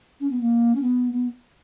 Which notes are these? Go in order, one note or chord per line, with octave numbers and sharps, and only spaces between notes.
C#4
B3
A#3
C#4
B3
B3